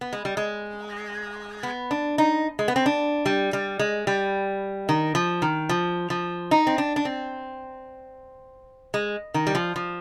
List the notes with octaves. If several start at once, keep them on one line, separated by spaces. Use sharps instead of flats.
B3
G#3
G3
G#3
B3
D4
D#4
G#3
B3
C4
D4
G3
G3
G#3
G3
D#3
F3
D#3
F3
F3
D#4
C4
D4
D4
C4
G#3
D#3
G3
F3
F3